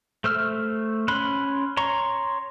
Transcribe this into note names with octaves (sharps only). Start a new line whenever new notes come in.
A3 C5 E6 F6
C#4 B5 C6 F#6
C#5 A#5 C6 C#6